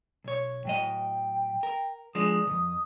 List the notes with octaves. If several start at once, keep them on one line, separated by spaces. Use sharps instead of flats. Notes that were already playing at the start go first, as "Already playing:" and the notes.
B1 C#5
A2 F#3 D#5 G5
A#4
F3 G#3 D4 D#6
C2 F2